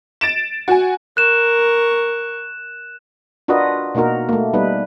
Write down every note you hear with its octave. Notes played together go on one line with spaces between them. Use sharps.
A6 D7 E7
F#4 G#5
A#4 C#6 F#6 E7
D4 F4 F#4 A#4 B4 D#5
B2 A#3 D#4 F#4 A#4
A3 A#3
G3 B3 D#4 B4